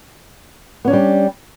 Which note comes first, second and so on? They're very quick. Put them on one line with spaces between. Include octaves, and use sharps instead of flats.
B3 C#4 D4 G3